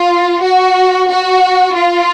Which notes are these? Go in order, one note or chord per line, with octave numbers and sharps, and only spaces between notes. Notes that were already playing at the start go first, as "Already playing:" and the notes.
Already playing: F4
F#4
F#4
F4